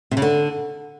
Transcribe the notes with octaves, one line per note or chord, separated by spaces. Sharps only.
C3
C#3
D3